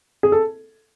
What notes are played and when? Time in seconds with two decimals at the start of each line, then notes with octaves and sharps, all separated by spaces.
0.23 G#4
0.32 A4